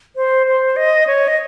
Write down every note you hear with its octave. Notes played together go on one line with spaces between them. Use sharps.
C5
C5
D#5
C#5
D#5